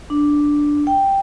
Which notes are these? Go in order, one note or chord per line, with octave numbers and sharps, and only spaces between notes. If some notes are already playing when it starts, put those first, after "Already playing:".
D4
G5